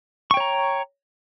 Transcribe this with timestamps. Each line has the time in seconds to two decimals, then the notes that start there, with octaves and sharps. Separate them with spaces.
0.31 C#6
0.34 G5
0.37 C#5
0.40 A#5